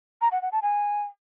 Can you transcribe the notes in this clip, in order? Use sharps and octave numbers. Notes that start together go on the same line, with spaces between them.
A#5
F#5
F#5
A5
G#5